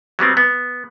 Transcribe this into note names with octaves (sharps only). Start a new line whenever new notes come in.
F#3 G3 B3 C4
B3